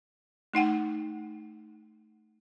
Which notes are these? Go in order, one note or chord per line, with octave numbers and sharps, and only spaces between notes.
A3 D#4 F#5 G5